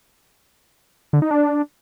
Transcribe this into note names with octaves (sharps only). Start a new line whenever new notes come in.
D3
D#4
D4